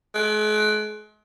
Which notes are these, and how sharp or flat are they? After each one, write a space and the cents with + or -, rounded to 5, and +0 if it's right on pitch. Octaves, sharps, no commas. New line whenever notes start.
G#3 +40